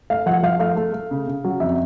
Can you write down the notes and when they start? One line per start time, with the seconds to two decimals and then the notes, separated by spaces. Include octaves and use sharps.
0.10 A3 F5
0.26 F3 F#5
0.43 F3 F5
0.59 A3 F5
0.76 A3
0.94 A3
1.11 C#3
1.27 C#3
1.44 F#3
1.60 F2 E5